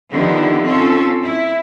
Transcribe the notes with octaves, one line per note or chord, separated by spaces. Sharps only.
D3 D#3 F3 B3 E4 G4
C4 C#4 F4 A4
E4